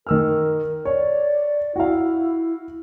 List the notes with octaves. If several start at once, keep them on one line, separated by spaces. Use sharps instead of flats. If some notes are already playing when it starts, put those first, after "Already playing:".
D#3 A#4 E6 F6
C#5 D5
E4 F#4 F5